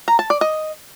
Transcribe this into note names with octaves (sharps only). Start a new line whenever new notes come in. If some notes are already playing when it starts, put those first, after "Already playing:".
A#5
A5
D5
D#5